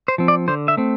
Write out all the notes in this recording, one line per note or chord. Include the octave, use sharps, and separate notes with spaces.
C5
F3 C4
D5
D3 C5
E5
A3 C4